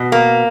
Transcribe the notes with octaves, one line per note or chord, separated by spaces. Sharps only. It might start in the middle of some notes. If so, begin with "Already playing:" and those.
Already playing: B2
A#3